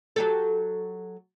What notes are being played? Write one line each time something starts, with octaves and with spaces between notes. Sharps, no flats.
F#3 G4 A4